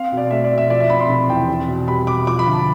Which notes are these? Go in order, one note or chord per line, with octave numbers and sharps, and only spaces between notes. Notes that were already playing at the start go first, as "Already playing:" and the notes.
Already playing: C4 F5
B2
D5
A3 E5
D5
B2
E5
F3 D5
E5
C4 B5
C6
C3 B5
E2 G5
C4
B2
G3 B5
B2 D6
F3 D6
B5
D2
A5